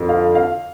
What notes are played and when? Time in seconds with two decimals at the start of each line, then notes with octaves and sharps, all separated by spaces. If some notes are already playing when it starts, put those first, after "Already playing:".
Already playing: F2 D3
0.09 F5
0.35 F5